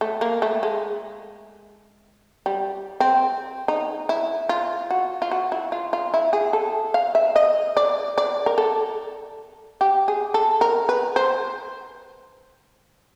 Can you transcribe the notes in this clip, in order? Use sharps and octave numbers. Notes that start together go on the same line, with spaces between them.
A3
A#3
A3
G#3
G3
C4
D#4
E4
F4
F#4
F4
F#4
E4
F4
F4
E4
G#4
A4
F5
E5
D#5
D5
D5
A#4
A4
G4
G#4
A4
A#4
B4
C5